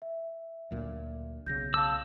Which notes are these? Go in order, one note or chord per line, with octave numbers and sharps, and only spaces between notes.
E5
D2 A#2 F#3
B1 C#3 G6 A#6
F5 A5 D6 E6